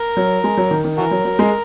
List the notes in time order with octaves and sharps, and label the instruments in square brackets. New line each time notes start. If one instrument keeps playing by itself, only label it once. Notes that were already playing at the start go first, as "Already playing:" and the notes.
Already playing: [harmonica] A#4
[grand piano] F#3
G#3
F#3
D#3
D#3
[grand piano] E3 [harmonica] F#4 A#4
[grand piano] F#3
F#3
G#3